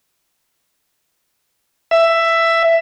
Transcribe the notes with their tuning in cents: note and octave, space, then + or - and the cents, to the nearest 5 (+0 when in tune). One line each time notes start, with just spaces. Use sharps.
E5 +10